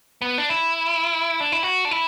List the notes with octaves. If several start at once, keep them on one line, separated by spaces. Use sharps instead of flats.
B3
D4
E4
D4
E4
F#4
D4
E4